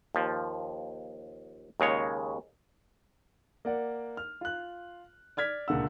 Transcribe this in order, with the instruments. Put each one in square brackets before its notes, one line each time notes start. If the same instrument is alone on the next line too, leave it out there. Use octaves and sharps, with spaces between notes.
[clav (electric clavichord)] D#2 F3
D#2 C#3 G#3 C#5
[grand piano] A#3 D5 F#5
F6
F4 F#6
D5 F6 G#6 B6
C#2 A#2 D3 F#5 E6